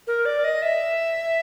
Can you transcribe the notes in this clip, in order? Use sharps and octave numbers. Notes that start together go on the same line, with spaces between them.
A#4
D5
D#5
E5